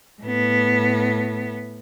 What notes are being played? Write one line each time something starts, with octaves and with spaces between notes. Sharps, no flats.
A2 B3